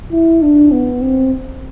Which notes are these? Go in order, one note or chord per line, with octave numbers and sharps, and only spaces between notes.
E4
D4
B3
C4